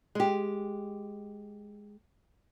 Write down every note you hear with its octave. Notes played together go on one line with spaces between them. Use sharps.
G#3 G4